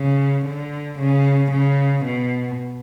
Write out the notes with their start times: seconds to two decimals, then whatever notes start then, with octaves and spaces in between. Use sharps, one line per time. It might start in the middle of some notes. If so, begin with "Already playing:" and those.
Already playing: C#3
0.46 D3
0.99 C#3
1.52 C#3
2.05 B2